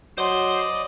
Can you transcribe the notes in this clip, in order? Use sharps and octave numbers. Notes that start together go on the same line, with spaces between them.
F#3 C5 D5 D#5 C6